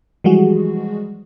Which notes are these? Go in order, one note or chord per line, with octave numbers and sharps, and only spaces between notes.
E3 F3 G3 G#3 F#4 G#4